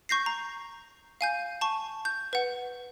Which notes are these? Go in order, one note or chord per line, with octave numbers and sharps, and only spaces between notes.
C#6 G6 A#6 C7
A#5
F5 G#5 G6
A5 C#6
G6
B4 F#5